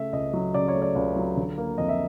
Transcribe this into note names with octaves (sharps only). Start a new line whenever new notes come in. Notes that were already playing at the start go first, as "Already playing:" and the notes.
Already playing: C#3 A3 E5
C#2 D#5
F#3
C#3 D5
C#5
A3
D5
C#2 D5
F#3
D3
A#3
F2 D#5
E5